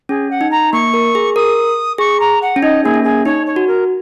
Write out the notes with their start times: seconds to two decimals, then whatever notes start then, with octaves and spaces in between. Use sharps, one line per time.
0.09 C#4 G#4
0.30 F#5
0.41 D#4
0.51 A#5
0.73 A#3 C#6
0.94 A#4
1.15 G#4
1.36 A#4 D#6
1.98 G#4 C#6
2.20 A#5
2.42 F#5
2.56 C#4
2.63 D#4 D#5
2.84 A#3 G#4
2.94 C#4
3.04 G#4
3.25 D#4 C#5
3.46 C#5
3.56 F#4
3.67 A#4